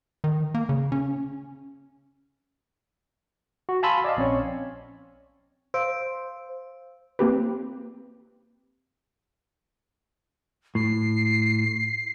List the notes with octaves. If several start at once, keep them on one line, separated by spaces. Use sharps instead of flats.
D#3
A#3
C#3
C#4
F#4
F5 G#5 A5 B5 C6 E6
D5 D#5 F5
A#1 C4 C#4 C#5
C5 F5 E6 D7
A#3 C4 G4 B4
A2 C7